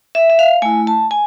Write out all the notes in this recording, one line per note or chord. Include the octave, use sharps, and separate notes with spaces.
E5
E5
F5
A3 E4 G#5
A5
G#5